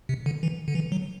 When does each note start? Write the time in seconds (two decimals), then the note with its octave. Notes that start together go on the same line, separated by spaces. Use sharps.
0.09 C3
0.26 D3
0.43 E3
0.68 D3
0.75 E3
0.92 F#3